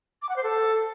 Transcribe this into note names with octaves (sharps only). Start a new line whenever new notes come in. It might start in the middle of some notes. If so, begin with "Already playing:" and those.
D6
F#5
C5
A4